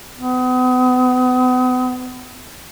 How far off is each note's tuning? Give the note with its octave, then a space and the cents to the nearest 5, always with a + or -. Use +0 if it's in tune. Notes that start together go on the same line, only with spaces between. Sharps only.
B3 +40